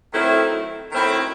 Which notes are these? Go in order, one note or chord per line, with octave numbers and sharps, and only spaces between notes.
D#3 F#3 A3 C4 E4
D#3 F#3 A3 C4 E4